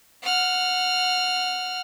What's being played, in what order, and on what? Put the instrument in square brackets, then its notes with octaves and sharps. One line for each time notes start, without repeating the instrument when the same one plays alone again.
[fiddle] F#5 F6